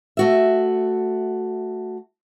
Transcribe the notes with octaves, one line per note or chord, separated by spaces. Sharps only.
A3 F#4 E5